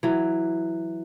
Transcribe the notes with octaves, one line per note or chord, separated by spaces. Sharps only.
E3 F#3